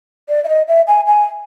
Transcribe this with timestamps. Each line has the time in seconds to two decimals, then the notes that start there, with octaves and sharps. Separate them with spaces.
0.29 D5
0.44 E5
0.49 D#5
0.68 E5
0.88 G#5
1.07 G#5